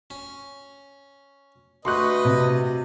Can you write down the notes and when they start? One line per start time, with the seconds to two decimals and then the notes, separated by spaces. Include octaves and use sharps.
0.10 C#4
1.85 D2 B4 D#5 C6 C#6 F#6
2.25 C3